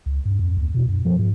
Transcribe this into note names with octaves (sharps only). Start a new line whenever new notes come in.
C#2
G2
F2
D2
B2
F#2
F3
G#2